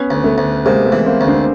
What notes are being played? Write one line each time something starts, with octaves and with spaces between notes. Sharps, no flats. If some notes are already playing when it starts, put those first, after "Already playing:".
Already playing: B3 C#4
D2
A3 B3
D2
C3 G#3 A#3
A3 B3
E3
A#3 C4
D2
C4 D4